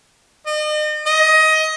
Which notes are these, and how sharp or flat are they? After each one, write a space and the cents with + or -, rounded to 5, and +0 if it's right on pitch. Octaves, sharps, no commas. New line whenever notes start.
D#5 -40
D#5 +20